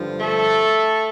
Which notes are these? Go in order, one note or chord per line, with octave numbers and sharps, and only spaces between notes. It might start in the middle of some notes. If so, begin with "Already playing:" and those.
Already playing: G2 D3 F3
A3 A4